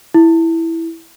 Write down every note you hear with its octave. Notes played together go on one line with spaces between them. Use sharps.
E4